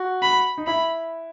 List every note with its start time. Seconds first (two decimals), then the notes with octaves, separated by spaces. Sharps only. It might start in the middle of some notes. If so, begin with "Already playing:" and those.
Already playing: F#4
0.22 B5
0.58 D#4
0.67 E4 B5